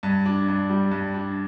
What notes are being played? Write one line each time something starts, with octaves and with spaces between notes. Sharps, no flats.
G2
D4
G2
G3
G2
D4